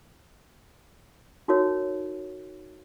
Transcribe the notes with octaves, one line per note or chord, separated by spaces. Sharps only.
D#4 F#4 A#4 C#5